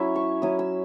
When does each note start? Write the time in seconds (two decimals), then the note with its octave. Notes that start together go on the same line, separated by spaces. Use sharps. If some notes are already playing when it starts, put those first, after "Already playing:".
Already playing: F#3 C#4 E4 C#5 E5
0.16 C#6
0.42 F#3 C#4 E4 D#6
0.59 E6